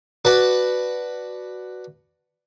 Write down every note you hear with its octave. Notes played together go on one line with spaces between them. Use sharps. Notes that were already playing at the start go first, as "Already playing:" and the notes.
F#4 B4 D5 A5